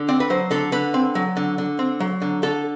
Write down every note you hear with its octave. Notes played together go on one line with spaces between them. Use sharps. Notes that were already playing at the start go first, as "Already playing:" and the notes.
Already playing: D3
C4 D5
B4
F#3 C5
D3 A4
D3 B4
C4
F#3
D3
D3
C4
F#3
D3
D3 A4